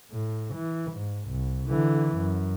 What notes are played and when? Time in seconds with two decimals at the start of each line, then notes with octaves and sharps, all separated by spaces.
0.12 A2
0.55 E3
0.92 G#2
1.29 C2
1.67 D3 E3
2.16 F#2